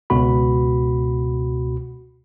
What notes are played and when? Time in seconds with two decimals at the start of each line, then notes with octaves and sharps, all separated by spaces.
0.10 C#2 B2 F#4 B5